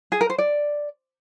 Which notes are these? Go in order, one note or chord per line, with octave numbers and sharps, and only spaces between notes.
G#4
A#4
C5
D5